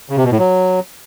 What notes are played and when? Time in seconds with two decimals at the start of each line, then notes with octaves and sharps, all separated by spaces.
0.10 C#3
0.17 C3
0.24 B2
0.31 A2
0.39 F#3